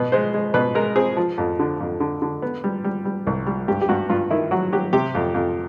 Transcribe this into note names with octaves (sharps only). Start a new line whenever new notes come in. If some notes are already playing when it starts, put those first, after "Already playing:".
Already playing: B2 B4
G#3 C5
G#3
B2 B4
G#3 A#4
C4 G#4
F3
F2
D3
F2
D3
D3
B3
G3
G3
G3
C2
G3
G2 G4
G4
G2 F#4
G2 F4
D#3 E4
F#3 F#4
F#3 G4
C3 G4
F2
F2